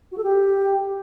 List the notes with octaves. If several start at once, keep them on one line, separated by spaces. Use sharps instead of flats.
F#4
A4
G4